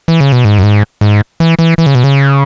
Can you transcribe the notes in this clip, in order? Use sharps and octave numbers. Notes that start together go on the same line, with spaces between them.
E3
C#3
B2
G#2
F#2
G#2
G#2
E3
E3
E3
C#3
B2
C#3